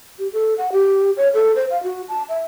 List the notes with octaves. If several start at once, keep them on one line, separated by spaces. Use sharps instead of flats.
G4
A4
F#5
G4
C#5
A4
C5
F5
F#4
A5
E5